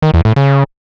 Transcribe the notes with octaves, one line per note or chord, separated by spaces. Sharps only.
D#3
E2
A2
C#3